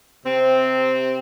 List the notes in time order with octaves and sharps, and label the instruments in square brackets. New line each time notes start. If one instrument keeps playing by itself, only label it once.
[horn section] C3 C4